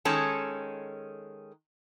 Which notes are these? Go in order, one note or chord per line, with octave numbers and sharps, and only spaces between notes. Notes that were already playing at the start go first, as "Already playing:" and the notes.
D#3 G#3 C#4 A4